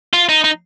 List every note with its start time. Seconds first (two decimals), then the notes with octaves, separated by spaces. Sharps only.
0.13 F4
0.29 D#4
0.44 D#4